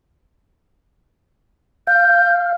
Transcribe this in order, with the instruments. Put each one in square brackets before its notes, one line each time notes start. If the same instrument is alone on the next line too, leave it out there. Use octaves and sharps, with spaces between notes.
[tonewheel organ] F5 [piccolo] G6